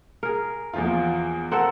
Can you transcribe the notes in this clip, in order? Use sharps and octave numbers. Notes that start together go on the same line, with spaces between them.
G#4 A#4
E2 F3 F4
C4 A4 A#4 F#5